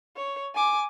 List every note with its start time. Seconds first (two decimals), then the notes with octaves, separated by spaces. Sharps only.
0.16 C#5
0.55 G#5 D6